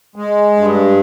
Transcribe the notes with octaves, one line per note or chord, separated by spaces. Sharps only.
G#3
G2